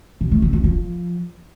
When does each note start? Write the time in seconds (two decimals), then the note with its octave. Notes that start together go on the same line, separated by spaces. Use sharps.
0.21 B2
0.31 A3
0.42 C3
0.53 F#3
0.64 F3